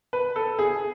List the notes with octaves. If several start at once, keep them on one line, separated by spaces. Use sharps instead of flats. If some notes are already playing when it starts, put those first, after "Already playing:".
B4
A4
G#4